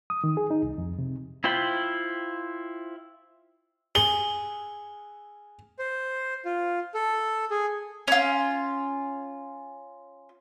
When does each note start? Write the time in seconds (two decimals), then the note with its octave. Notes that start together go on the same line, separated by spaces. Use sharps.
0.10 D#6
0.24 D#3
0.37 G#4
0.51 D#4
0.63 C2
0.78 F2
0.98 C3
1.44 E4 F4 C5 G5 B5
3.95 G#4 G7
5.79 C5
6.45 F4
6.94 A4
7.51 G#4
8.08 C#4 F4